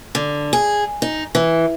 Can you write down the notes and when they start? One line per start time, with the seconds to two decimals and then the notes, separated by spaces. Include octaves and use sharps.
0.15 D3
0.53 G#4
1.02 D#4
1.35 E3